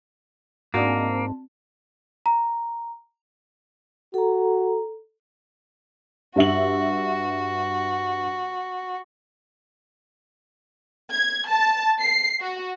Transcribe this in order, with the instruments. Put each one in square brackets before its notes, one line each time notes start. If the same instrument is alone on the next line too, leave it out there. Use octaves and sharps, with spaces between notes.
[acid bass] G#2 [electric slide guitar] A#3 [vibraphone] C4 A5 [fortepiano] D4 F#4
[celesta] A#5
[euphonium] F#4 [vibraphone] A4 A#5
[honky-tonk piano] G2 E5 F#7 [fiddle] F#4
[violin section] G#6
A5
C7
F#4